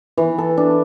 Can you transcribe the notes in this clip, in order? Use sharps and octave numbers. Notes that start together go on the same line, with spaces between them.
E3
A4
D4